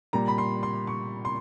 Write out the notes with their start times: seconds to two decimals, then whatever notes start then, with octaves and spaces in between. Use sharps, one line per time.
0.13 A#2 G3 A#5
0.28 B5
0.38 C6
0.63 C6
0.87 C#6
1.25 C6